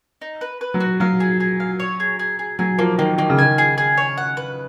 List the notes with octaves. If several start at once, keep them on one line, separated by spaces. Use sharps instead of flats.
D#4
B4
B4
F#3
F#4
F#3 F5
G#4
G#4
F5
C#5
G#4
G#4
G#4
F#3 G#4
F3 A#3
D#3 A#3
D#3 A#3
C#3
D#3 G#5
G#4
G#4
C#5
F#5
B4